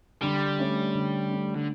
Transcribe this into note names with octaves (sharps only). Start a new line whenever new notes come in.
D3 G3
A3 C#4
D3
A3 C#4
D3